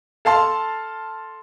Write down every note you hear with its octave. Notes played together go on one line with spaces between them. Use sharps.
A4 F5 A5 C6